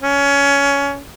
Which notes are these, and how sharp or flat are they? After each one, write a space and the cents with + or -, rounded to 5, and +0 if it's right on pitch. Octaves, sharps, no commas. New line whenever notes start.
C#4 +20